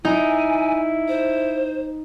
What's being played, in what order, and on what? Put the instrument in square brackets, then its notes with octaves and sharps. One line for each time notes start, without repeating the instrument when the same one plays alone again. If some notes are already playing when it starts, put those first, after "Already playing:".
[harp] D#4 [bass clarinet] E4 [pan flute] G#5
[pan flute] C5